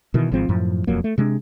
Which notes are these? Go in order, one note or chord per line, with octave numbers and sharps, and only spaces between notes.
B2 D#3 E3
G#1 G#2 F3 C4
F#2 A2 F3
E1 F2 F#3 A#3
A3
C3 G#3 A#3 D4